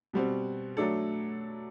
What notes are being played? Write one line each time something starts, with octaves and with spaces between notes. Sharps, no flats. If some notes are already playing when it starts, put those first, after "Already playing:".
B2 G3 C4 F#4
F#3 A3 D4 A4